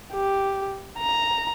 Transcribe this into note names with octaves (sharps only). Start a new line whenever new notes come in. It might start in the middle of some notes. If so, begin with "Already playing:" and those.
G4
A#5